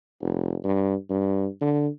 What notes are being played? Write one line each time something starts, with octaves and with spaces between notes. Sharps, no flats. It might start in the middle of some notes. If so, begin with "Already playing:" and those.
F1
G2
G2
D3